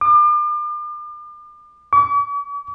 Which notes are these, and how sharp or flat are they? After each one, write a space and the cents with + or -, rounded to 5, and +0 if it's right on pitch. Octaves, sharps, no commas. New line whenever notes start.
D6 +40
D6 -45